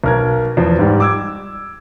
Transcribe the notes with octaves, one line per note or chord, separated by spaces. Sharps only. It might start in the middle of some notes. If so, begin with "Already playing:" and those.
B1 A#4 G#6
E2 F3
G#2 G3
D6 E6 G#6